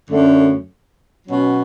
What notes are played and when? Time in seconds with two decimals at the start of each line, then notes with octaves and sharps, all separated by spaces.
0.10 F#2 D3 A3
1.27 B2 F#3 C#4